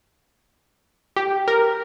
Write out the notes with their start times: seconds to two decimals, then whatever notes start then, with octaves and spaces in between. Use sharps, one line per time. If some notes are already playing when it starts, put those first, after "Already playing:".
1.16 G4
1.48 A#4